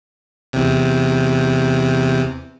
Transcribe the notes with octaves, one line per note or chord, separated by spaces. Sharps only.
E2 C3